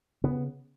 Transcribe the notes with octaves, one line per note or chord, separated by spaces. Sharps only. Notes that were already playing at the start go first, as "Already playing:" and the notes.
C#3 B3